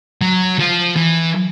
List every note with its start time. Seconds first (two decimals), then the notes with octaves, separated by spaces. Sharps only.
0.21 F#3
0.59 F3
0.96 E3